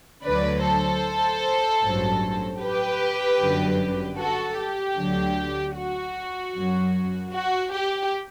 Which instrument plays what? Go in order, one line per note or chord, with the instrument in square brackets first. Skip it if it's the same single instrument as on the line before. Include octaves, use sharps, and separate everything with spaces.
[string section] D2 D3 F#3 B4 D5
A4 C5
A1 G2 F#3
G4 B4
G1 F#2 D3 F#3
F#4 A4
G4
D2 D3 F#3
F#4
F#2 F#3
F#4
G4